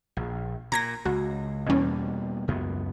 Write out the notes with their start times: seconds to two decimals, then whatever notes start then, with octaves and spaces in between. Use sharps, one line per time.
0.17 A#1
0.72 A#2 A#5 G#6 A#6
1.05 C#2 F#4
1.69 E2 B2 G3 A#3 C#4
2.48 C#2 F#2 B3